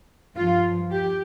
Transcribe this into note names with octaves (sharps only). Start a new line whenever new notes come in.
G2 F3 F4
G4